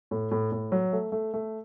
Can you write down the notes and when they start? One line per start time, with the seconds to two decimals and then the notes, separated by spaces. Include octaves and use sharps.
0.11 A2
0.31 A2
0.52 A2
0.72 F#3
0.93 A3
1.12 A3
1.34 A3